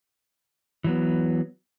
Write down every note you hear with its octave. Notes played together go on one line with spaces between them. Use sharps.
E3 F#3 B3